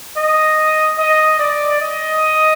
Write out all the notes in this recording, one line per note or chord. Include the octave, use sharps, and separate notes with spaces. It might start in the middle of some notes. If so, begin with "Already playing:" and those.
D#5
D#5
D5
D#5